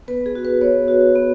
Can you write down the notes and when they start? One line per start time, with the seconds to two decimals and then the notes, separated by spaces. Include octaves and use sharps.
0.08 B3 B4
0.26 G#4
0.35 F#4
0.45 B4
0.61 B3 C#5
0.88 F#4
1.16 B3